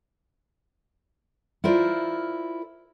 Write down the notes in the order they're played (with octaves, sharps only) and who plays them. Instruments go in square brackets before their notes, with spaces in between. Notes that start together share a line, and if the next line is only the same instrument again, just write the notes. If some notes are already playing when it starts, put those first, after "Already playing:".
[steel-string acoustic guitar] E4 F4 A#4 C5 D5